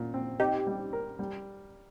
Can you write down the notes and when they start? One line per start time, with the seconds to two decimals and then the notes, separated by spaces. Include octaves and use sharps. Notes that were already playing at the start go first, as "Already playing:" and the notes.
Already playing: A#2
0.14 C4
0.40 C4 D#4 G4
0.67 G3
0.93 A#4
1.19 G3